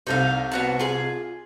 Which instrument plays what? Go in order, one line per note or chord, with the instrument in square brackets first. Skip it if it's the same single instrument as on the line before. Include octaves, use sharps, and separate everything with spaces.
[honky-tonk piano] C2 C3 [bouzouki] D#4 A4 F5
[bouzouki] B3 F#4 A5
F4 G#4